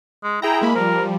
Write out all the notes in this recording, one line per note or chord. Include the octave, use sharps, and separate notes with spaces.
G#3
E4 G#4 G5 A#5
G#3 A#3 B5
F3 G3 A#4